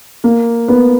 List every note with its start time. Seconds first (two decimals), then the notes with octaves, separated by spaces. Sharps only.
0.24 A#3
0.68 B3